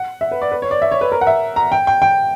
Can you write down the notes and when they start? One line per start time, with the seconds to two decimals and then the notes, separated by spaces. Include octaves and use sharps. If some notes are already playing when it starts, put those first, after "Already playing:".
Already playing: F#5
0.21 E5
0.31 B4
0.42 D5
0.52 B4
0.62 C#5
0.71 D5
0.82 E5
0.92 C#5
1.01 B4
1.12 A#4
1.21 F#5
1.27 E5
1.56 A#5
1.72 G5
1.87 G5
2.02 G5